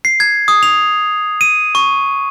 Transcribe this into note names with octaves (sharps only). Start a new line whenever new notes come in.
C7
G#6
D#6
F7
D#7
C#6